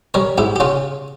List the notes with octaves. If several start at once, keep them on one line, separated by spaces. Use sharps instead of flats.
G3 A#4 C#5
G#2 E4 G4
G4
C#3 C#4 F4